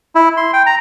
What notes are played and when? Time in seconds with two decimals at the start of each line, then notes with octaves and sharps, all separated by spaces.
0.15 E4
0.37 C6
0.53 G5
0.66 A#5